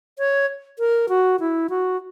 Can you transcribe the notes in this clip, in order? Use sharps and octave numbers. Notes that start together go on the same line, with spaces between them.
C#5
A#4
F#4
E4
F#4